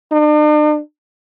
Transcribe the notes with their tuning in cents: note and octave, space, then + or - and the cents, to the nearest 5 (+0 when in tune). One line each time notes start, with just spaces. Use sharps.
D4 +45